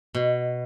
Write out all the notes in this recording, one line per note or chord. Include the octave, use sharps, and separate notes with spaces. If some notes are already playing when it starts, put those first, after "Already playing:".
B2